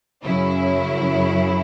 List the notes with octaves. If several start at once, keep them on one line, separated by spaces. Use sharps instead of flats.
F#2 C#3 F#3 C#4 E4